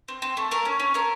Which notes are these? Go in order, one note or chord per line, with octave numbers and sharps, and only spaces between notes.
C4
C4
A3
A3 A#4
C#4
C#4
A3 A#4